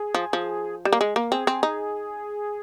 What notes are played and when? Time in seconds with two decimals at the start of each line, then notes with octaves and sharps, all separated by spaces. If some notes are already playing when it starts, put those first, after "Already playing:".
Already playing: G#4
0.14 F3
0.33 F3
0.85 G3
0.93 A#3
1.01 G#3
1.16 A#3
1.32 C4 G#4
1.47 C4
1.63 D#4